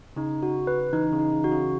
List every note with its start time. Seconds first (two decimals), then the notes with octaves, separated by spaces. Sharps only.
0.16 C#3 D#4
0.43 F#4
0.67 B4
0.93 E3 D#4
1.13 C#3
1.19 D#4
1.32 C#3
1.44 F#4
1.51 C#3